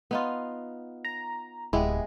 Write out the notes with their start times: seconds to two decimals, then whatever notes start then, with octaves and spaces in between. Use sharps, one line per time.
0.11 B3 D#4 F4
1.05 A#5
1.73 D1 G#3 B3 E4 G4 G#4